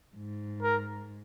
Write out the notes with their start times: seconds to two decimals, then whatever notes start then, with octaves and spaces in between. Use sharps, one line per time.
0.16 G#2
0.62 A#4